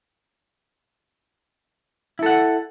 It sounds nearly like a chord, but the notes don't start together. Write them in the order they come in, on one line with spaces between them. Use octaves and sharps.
E4 A4 F#5